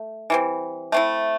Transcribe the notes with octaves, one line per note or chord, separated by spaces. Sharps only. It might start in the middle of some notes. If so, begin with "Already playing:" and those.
Already playing: A3
E3 G3 C4
A3 C4 E4